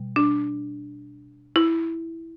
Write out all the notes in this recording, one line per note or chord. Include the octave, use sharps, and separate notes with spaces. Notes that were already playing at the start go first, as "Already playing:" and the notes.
Already playing: B2 G3
D4
E4